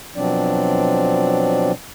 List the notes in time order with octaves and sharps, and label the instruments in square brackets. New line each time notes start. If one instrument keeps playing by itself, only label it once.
[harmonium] B2 F3 F#3 C4 D4 D5